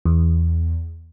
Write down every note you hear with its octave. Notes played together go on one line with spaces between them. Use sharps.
E2